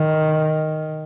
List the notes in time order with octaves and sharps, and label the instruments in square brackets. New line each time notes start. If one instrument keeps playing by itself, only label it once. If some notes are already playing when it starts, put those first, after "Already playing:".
Already playing: [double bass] D#3